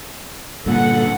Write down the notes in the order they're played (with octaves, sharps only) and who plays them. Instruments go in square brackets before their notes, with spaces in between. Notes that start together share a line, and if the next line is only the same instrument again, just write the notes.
[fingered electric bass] G2 A#2 D3 [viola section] A4 F#5